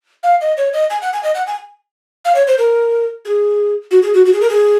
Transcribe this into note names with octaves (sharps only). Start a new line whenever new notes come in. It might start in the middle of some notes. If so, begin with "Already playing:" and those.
F5
D#5
C#5
D#5
G#5
F#5
G#5
D#5
F#5
G#5
F5
C#5
C5
A#4
G#4
F#4
G#4
F#4
F#4
G#4
A#4
G#4